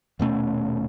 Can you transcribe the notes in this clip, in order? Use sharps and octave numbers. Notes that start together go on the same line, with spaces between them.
D#1 B2 A3 C#4